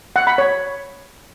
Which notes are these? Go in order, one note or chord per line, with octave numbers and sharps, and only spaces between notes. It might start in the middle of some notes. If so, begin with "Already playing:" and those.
F#5
B5
C#5